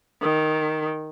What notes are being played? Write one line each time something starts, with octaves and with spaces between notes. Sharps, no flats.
D#3